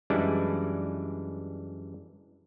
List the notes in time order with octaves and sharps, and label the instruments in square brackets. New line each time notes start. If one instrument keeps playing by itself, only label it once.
[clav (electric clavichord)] F#2 E3 G3 G#3 D4 E4